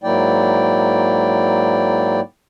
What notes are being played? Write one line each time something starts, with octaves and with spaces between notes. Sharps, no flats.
G#2 F#3 A#3 E4 D5 G5